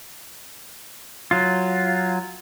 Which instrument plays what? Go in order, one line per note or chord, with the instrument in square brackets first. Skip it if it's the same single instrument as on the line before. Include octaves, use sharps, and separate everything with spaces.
[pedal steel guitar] F#3 F4